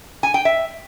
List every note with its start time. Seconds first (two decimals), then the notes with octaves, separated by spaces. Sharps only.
0.23 G#5
0.34 G5
0.45 E5